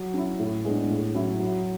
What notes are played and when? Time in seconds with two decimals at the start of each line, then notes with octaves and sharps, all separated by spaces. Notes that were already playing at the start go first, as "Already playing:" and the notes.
Already playing: F#3
0.14 C#4 E4
0.39 A2
0.65 G#3 B3 D4
0.90 A2
1.15 F#3 C#4 E4
1.40 F#3